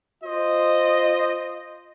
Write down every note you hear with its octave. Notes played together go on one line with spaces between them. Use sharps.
F4 C5 D#5